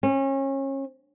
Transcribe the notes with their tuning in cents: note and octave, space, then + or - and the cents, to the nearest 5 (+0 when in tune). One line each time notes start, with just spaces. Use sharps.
C#4 -30